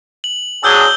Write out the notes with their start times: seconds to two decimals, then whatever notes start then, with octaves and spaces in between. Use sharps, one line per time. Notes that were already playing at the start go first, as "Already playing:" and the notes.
0.24 F#7
0.64 F#3 D4 G#4 E6 G6 G7